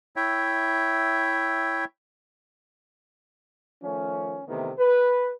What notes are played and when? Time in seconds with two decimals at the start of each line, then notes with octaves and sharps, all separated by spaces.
0.16 E4 C#5 E5 G5
3.83 D#3 F3 A3 C#4
4.48 C3 D#3 E3 A3 B3
4.78 B4